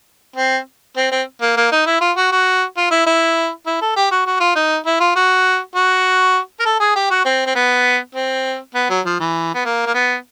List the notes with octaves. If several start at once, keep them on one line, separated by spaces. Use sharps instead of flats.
C4
C4
C4
A#3
A#3
D#4
E4
F4
F#4
F#4
F4
E4
E4
E4
A4
G4
F#4
F#4
F4
D#4
E4
F4
F#4
F#4
A#4
A4
G#4
G4
F#4
C4
C4
B3
C4
B3
F#3
F3
E3
B3
A#3
A#3
B3